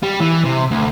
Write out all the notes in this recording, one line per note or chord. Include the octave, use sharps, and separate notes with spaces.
G3
E3
C3
D2